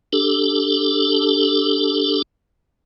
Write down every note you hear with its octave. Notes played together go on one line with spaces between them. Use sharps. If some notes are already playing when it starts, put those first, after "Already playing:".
D4 G4 A4